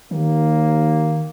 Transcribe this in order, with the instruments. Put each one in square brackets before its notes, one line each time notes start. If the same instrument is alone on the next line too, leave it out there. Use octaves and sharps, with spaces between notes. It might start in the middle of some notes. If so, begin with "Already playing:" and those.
[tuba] D#2 [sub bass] D#3 [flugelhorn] A#3